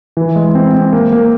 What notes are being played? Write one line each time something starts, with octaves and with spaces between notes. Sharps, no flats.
E3
G#3
C4
C4
A#3
A#3